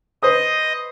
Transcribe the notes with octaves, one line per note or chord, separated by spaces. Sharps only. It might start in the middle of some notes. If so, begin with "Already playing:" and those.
B4 C5 D#5 D#6